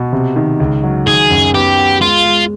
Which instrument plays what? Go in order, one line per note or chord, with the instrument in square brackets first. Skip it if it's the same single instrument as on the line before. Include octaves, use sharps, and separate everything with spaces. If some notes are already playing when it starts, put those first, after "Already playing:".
Already playing: [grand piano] B2
C3
D#3
C#2
F#3
[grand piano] D#3 [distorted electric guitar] G#4
[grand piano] F#2
[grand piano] B3 [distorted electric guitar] G4
[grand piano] B3
[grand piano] G#3 [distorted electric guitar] F4
[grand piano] G#3